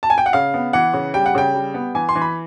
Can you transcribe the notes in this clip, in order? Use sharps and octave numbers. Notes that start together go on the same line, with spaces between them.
A5
G#5
G5
F#5
C#3 F5
B3
E3 F#5
C#3
G3 G5
F#5
C#3 G5
G3
B3
E3 G#5
C6
E3
B5